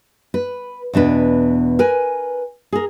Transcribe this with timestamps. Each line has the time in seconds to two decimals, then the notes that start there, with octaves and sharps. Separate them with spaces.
0.34 B4
0.93 E2 B2 D4 B4
1.79 A#4 B4 G#5
2.73 G#4 A#4